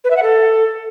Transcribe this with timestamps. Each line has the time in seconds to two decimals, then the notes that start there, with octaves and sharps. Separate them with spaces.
0.04 B4
0.10 E5
0.17 F#5
0.23 A4